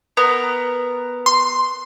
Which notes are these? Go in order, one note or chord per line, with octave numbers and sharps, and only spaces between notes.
B3 A#4
C6